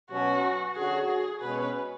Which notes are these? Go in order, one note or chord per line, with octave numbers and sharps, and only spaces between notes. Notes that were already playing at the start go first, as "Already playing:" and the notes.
B2 F#3 C#4 F#4
D3 F#3 C#4 F#4 G#4
G#4
B2 G#3 C#4 B4